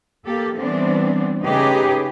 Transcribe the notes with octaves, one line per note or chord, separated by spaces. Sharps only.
A#3 G4 A4
E3 G3 B3 C4 D4
C#3 A3 D#4 G4 G#4 B4